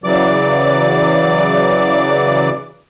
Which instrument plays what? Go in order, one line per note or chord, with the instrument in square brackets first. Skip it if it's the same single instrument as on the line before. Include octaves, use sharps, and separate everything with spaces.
[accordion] C#3 E3 F#3 D5 D6